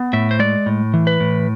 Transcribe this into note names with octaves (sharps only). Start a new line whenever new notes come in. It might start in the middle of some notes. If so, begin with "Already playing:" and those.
Already playing: B3
A2 E5
C5
G#3 D5
A2
E3
B4
A2